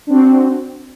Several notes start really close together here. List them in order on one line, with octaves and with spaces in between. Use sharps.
D4 C4 F#4